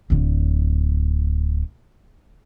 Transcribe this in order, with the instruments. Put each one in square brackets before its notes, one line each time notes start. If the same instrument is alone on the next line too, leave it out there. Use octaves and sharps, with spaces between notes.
[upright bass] D1 D3